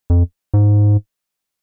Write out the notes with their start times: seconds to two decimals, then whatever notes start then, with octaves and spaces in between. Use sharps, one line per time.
0.10 F2
0.54 G#2